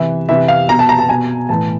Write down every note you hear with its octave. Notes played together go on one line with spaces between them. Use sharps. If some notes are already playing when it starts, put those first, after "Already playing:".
Already playing: C3 E3 E5
C3 E3 E5
F5
B2 A#5
A5
A#5
A5
B2 G#5
A2 E3 A5